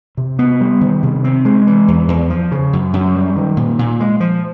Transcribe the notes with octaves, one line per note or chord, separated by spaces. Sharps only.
C3
B3
G3
D#3
C3
C4
G#3
E3
E2
E2
F3
C#3
F#2
F#2
G3
D#3
A#2
A#2
G#3
F3